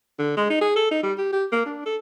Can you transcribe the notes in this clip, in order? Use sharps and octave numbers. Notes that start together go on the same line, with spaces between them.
D3
G#3
D#4
G#4
A4
D#4
G3
G4
G4
A#3
D4
A4